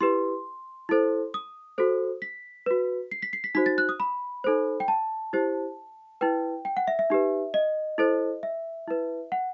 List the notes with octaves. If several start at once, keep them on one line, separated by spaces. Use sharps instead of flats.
E4 G4 B4 C6
E4 A4 C5
D#6
F#4 A4 C5
B6
F#4 B4
C7
B6
C7
B6
D#4 F#4 C5 B6
A6
F#6
D#6
B5
D#4 A4 C5
G5
A5
E4 G4 C5
E4 B4 G5
G5
F#5
E5
E5
D#4 G4 B4
D#5
E4 A4 C5
E5
E4 B4
F#5